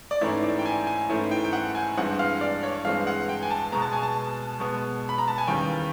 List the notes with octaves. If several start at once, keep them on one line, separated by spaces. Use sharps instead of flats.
D5
G#2 E3 A3 C#4 E4 C#5
D5
G5
G#5
G#5
G#2 E3 A3 C#4 E4
G5
G5
F#5
G#5
G2 E3 G#3 C4 F#5
F5
D5
C#5
G2 E3 G#3 C4 F5
F#5
G5
G#5
A5
B2 G#3 B3 A#5
A5
G#5
A5
B2 G#3 B3
B5
A#5
A5
G#5
D#2 C#3 E3 G3 G5